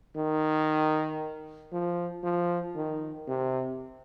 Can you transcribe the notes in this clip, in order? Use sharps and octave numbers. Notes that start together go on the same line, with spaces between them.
D#3
F3
F3
D#3
C3